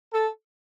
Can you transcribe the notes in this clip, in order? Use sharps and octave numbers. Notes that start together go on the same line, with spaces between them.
A4